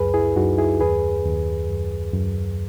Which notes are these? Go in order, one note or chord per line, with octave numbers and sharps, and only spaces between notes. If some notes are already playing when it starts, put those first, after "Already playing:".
Already playing: C#2 F#2 G#4 B4
E4 G#4
F#2 D#4 F#4
E4 G#4
D#2 G#4 B4
D#2
F#2
F#2